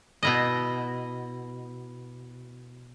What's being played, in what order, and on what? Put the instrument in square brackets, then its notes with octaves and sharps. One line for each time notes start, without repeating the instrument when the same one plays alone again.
[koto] B2 E4 D#5